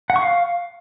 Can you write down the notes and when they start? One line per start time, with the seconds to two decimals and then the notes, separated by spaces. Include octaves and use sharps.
0.10 F#5
0.16 C#6
0.22 F5